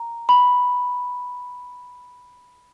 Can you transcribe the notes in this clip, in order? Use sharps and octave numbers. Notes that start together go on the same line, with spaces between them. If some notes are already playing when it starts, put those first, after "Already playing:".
Already playing: A#5
B5